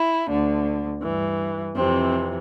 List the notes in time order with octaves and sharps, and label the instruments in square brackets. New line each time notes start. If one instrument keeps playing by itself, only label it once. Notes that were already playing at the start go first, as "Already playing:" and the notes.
Already playing: [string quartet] E4
D2 D3
G2 E3
F2 C3 E3 C4